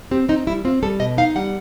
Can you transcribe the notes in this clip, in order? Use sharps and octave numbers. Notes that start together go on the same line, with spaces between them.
C4 G4
C4 D#4
G3 E4
C4 F4
G3 A4
B2 D#5
D#4 F5
G3 F#5